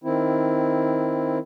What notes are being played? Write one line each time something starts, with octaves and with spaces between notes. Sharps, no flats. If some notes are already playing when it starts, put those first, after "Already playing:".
D#3 C4 E4